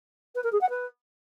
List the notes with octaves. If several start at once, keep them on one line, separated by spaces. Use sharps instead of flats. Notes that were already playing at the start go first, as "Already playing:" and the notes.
B4
A#4
G#4
F#5
B4